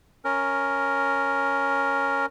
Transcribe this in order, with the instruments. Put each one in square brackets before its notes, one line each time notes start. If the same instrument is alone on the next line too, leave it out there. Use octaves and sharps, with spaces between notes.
[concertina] C#4 A#4